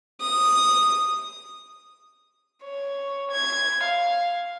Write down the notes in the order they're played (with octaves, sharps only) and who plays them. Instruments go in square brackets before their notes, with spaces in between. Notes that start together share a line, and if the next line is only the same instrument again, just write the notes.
[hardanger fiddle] D#6
[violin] C#5
G#6
F5